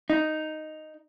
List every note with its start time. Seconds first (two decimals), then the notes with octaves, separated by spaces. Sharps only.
0.10 D#4